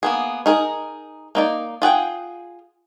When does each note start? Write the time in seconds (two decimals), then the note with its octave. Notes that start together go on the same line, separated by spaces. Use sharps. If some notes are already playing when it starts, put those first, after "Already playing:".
0.03 A#3 B3 G#4
0.46 D#4 G#4 A#4
1.35 A#3 D#4 D5
1.82 F4 G#4 F#5 G5